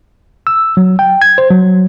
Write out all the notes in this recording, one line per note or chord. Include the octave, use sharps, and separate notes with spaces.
E6
F#3
G5
G#6
C5
F#3